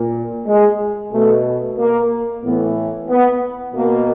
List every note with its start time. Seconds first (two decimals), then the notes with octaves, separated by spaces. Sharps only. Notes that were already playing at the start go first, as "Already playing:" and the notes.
Already playing: A#2
0.47 G#3
1.12 B2 A3
1.78 A#3
2.43 A2 E3 B3
3.09 B3
3.74 B2 A#3